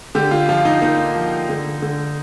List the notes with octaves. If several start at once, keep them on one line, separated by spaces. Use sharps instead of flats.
D3 G4
F4
F3 F4
D#4
A#3 D#4
F3
D3
D3